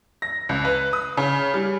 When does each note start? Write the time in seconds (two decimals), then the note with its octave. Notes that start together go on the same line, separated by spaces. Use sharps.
0.22 A#6
0.49 C#2
0.65 B4
0.93 D#6
1.17 C#3
1.54 G3